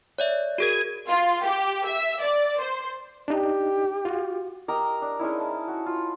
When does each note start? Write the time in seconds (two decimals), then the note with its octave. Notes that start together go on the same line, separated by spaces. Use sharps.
0.19 C#5 D5 E5
0.58 F#4 G#4 A#4 G#6 D#7
1.08 F4
1.44 G4
1.86 E5
2.20 D5
2.59 C5
3.28 D4 D#4 G4
4.05 F4 F#4
4.68 G4 A#4 D#5 A#5
5.02 D4
5.19 G#3 C#4 D#4 E4
5.40 A5
5.68 F#4
5.86 F4